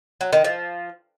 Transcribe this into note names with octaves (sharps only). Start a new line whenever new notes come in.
F#3
D#3
F3